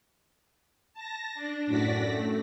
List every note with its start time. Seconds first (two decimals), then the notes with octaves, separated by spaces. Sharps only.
0.94 A5 A#6
1.35 D4
1.67 F#2 A2 F#4 D5 A#6 B6
2.06 A3